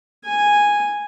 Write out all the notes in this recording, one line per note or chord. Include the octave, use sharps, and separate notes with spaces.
G#5